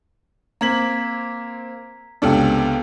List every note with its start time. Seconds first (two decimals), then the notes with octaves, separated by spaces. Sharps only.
0.61 A#3 C4 A#5 G#6 B6 F#7
2.22 C#2 C3 B3 D4 A4 G5